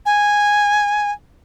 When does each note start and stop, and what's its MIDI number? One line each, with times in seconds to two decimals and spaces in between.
0.06 1.11 80